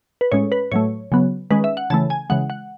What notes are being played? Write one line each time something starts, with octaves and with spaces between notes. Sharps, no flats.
B4
A2 G#3 C#4 C#5
B4
A2 F#3 A3 C#5
C#3 F#3 B3
D#3 G#3 C#4 B4
E5
F#5
C#3 E3 A3 A5
G#5
C#3 E3 G#3 F#5
F#5